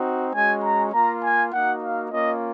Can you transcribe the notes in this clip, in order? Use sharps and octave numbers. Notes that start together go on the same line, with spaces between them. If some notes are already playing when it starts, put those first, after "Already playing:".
Already playing: C4 D#4 F#4
G#3 C#4 F#4 G#5
A#5
A#3 F4 A#5
G#5
A#3 D#4 F#4 F#5
F5
A#3 C#4 F4 D#5